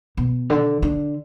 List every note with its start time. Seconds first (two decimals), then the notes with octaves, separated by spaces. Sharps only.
0.17 B2
0.50 D3
0.82 D3